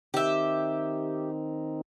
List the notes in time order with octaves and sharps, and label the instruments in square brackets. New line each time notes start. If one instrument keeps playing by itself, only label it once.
[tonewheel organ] D#3 C4 D#4 [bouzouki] G4 E5